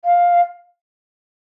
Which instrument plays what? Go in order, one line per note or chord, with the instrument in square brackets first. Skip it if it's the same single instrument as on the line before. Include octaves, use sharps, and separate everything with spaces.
[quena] F5